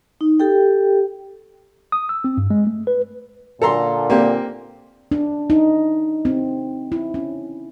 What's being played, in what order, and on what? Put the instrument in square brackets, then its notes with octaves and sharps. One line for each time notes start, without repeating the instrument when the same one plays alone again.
[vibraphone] D#4
G4 A4 G5
[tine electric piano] D#6
E6
C4
G2
G#3
A3
B4
[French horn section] A#2 D3 [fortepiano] A4 A#5 C6
[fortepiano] A#3 C4 G4
[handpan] D4
D#4
C4
E4
C#4